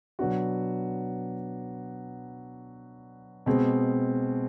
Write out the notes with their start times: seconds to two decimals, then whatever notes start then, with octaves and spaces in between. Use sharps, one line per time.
0.19 B2 F#3 B3 D4 F#4
3.46 B2 G#3 C4